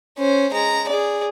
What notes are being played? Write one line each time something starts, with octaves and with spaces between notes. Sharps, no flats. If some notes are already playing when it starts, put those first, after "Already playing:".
C#4 C5
G#3 A#5
G#4 D5